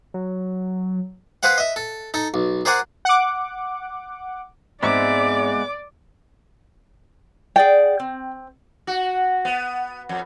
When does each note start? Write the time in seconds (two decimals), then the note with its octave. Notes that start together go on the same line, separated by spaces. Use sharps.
0.14 F#3
1.43 G#4 B4 C5 F5 F#5
1.58 D#5 E5
1.76 A4
2.14 D#4 A4
2.34 B1
2.65 G#4 A#4 C5 D5 F#5 G#5
3.05 F#5 D6
4.83 G#2 G#3 B3 C4 D5 E5 D6
7.56 G#4 D5 F#5 G5
8.00 C4
8.87 F#4
9.45 B3
10.09 F2